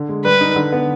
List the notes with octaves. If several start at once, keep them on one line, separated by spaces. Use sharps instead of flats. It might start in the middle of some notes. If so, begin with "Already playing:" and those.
Already playing: D3
G#3
G3 B4
D#4
D3
B3